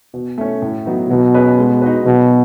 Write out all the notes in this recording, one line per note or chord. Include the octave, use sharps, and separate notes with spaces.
B2
A3 C#4
A2
F#3 B3 D#4
B2 F#3
C#4 G#4 B4 D#5
G#3
D#4 F#4 B4
B2 F#3